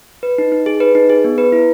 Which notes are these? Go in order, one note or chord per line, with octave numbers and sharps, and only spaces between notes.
B4
D#4
D#4
G#4
B4
D#4
G#4
B3
B4
E4